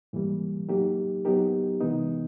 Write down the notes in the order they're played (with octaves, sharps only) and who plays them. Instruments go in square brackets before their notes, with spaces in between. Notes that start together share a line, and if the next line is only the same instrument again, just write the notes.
[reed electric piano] G#2 E3 G3 A#3
F#3 A#3 D#4 G4
F#3 B3 D#4 G4 A#4
C3 E3 G#3 B3 D#4